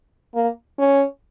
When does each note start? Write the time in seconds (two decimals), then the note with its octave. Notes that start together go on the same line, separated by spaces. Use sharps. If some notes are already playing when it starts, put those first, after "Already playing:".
0.35 A#3
0.78 C#4